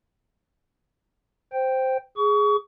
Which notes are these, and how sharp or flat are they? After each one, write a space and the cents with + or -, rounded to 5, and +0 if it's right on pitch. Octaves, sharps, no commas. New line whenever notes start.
C5 -5 G5 +0
G#4 +0 C#6 +30